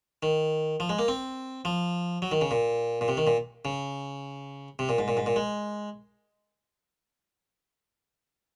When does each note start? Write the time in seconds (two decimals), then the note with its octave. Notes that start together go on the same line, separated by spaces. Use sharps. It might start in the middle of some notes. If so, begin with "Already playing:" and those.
0.23 D#3
0.80 F3
0.89 G#3
0.99 A#3
1.08 C4
1.65 F3
2.22 F#3
2.32 D#3
2.41 C#3
2.51 A#2
3.01 A#2
3.08 C3
3.17 D#3
3.27 A#2
3.65 C#3
4.79 C3
4.89 A#2
4.99 G#2
5.08 A#2
5.17 G#2
5.26 A#2
5.36 G#3